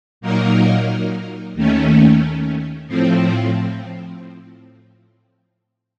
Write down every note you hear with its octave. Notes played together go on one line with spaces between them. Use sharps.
A#2 F#3 A#3 D#4 A#4
D#2 D#3 A3 C#4
A2 F3 C4